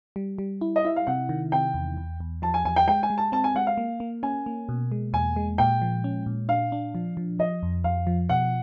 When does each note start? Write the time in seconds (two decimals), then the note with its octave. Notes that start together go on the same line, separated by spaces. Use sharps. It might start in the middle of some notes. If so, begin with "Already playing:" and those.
0.16 G3
0.38 G3
0.61 E4
0.76 D#5
0.85 E4 E5
0.96 F5
1.07 C3 F#5
1.29 D#3
1.52 C3 G5
1.74 E2
1.97 E2
2.20 E2
2.42 F3 A5
2.54 G#5
2.65 E2 G#5
2.76 G5
2.88 G#3 G5
3.03 G#5
3.10 G#3
3.18 A5
3.32 C4 A5
3.44 G#5
3.55 G#3 F#5
3.67 F5
3.78 A#3
4.00 A#3
4.23 C#4 G#5
4.46 A#3
4.69 B2
4.92 G#3
5.13 E2 G#5
5.36 G#3
5.58 A#2 G5
5.82 F3
6.04 C#4
6.26 A#2
6.49 D4 F5
6.72 D4
6.95 F3
7.17 F3
7.39 F3 D#5
7.63 F2
7.84 F2 F5
8.07 F3
8.29 B2 F#5